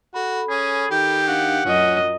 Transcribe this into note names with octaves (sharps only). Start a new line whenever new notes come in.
F#4 A4 B5
C#4 G#4
D#3 G4 G5
D4 F5 F#5
F#2 C#4 F4 D#5